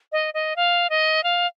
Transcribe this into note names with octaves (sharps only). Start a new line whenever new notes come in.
D#5
D#5
F5
D#5
F5